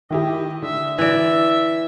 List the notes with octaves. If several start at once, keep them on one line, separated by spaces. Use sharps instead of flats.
D#3 E4 G4 D#5
D3 E5
E3 D5 E5